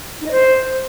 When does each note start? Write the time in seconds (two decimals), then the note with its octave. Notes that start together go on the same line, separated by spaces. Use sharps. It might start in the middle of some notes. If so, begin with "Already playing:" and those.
0.21 D#4
0.26 D#5
0.31 C5